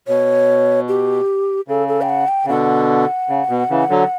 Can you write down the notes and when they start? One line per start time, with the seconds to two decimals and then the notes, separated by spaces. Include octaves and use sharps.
0.08 B2 C#5
0.89 G4
1.68 C#3 A4
1.88 A4
2.02 G5
2.09 F#5
2.28 G5
2.45 C#3
2.49 B2 D3 F#5
3.29 C#3
3.49 B2
3.70 C#3 E3
3.90 D3 F#3